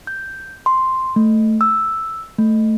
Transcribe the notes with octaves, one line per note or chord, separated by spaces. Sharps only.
G6
C6
A3
E6
A3